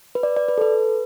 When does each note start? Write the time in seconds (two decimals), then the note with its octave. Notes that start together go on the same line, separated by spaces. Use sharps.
0.15 B4
0.23 D5
0.36 D5
0.49 B4
0.58 A4
0.61 B4